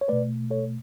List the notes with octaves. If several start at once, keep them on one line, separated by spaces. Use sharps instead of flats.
C#5
B2 A3 B4 D5
A4 C#5